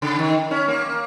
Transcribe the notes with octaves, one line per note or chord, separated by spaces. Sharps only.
C#3
D#3
C#4
A#3